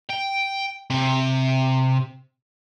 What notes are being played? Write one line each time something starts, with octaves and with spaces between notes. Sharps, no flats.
G5
C3